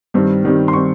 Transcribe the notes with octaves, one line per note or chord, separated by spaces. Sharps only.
G2 D#3 G3 C4
G2 D#3 G3 C4
C6
D#3 G3 C4 C#6